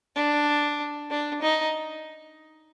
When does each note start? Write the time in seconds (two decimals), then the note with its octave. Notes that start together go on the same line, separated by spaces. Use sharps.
0.16 D4
1.10 D4
1.42 D#4